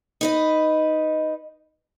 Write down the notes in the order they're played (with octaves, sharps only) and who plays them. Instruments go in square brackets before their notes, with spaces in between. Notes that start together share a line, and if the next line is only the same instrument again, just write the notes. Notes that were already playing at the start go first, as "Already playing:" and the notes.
[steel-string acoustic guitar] D#4 B4 D#5